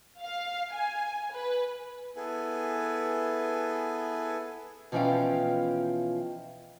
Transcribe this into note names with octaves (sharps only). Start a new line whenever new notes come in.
F5
G#5
B4
B3 E4 G#4 A4 B4 G#5
B2 E3 F3 C#4 F5 G5